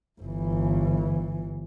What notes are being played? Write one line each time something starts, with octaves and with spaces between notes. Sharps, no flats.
G1 E3